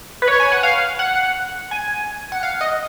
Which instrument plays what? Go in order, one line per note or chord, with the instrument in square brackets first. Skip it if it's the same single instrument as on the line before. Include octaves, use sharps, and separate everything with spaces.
[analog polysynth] B4
C#5
G#5
F#5
F5
F#5
G#5
F#5
F5
D#5